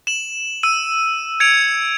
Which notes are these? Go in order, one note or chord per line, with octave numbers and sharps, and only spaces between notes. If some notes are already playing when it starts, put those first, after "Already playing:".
E7 F#7
E6 D#7
G#6 C#7 D7 F7